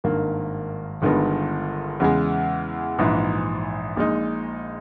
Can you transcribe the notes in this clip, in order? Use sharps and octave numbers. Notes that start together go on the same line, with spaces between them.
G#1 G2 D#3 A#3
G1 G2 D#3 G#3 B3
E2 C#3 G#3
A#1 G#2 E3
A#1 A#2 G#3 D#4